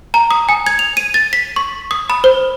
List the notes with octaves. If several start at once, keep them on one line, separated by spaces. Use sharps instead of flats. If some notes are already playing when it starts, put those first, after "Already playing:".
A#5
D#6
G#5
G#6
F7
D#7
A6
B6
C#6
D#6
B5
C5